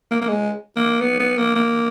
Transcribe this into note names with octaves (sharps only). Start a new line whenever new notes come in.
A#3
A#3
G#3
A#3
B3
B3
A#3
A#3